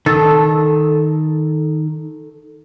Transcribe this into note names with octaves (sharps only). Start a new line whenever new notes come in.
D#3 A4